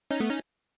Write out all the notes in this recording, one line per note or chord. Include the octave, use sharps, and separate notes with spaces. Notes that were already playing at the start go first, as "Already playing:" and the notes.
C#4 D#4
A3 B3
C#4 D#4